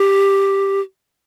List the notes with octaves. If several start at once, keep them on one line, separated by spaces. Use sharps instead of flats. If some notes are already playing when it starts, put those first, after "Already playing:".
Already playing: G4